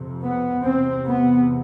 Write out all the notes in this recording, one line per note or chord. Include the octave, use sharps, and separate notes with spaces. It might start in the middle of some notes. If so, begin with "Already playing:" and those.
Already playing: F2 C3
B3
E2 C3 C4
B3